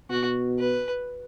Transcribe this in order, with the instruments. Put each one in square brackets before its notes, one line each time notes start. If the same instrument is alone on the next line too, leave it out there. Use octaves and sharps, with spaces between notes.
[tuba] B2 [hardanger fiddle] F#4
[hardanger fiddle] B4